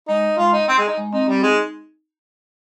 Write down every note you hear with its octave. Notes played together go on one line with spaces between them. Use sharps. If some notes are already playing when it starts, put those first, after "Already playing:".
G#3 D#4
G#3 F4
D#4
C4
G#3
D#4
G#3
C4 D#4
G3 C4
G#3 D#4